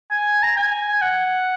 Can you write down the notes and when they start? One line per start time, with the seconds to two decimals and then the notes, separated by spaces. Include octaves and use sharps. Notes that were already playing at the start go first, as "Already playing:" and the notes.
0.11 G#5
0.43 A#5
0.57 G#5
0.95 G#5
1.02 F#5